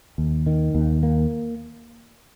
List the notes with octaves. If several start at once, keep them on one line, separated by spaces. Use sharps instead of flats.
D#2
D#3
D#2
A#3